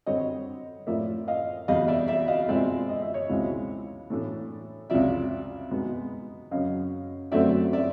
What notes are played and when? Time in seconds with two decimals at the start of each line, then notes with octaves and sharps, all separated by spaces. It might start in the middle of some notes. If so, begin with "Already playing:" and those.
0.06 D3 G3 C4 C#5 D#5
0.87 A2 F3 A#3 D5 E5
1.28 D#5 F5
1.68 E2 B2 G3 D#5 F5
1.88 D5 E5
2.08 D5 E5
2.28 D#5 F5
2.48 B2 G#3 C4 F4 D5 E5
2.89 D#5
3.01 E5
3.14 C#5 D#5
3.29 C#2 B2 G#3 C4 E4
4.10 A2 E3 A3 D4
4.90 C#2 C3 F3 D5 E5
5.71 B2 G#3 B3 D#4
6.51 F#2 C#3 F#3 D#5 F5
7.32 F#2 D3 F#3 A3 C4 D5 E5
7.73 D5 E5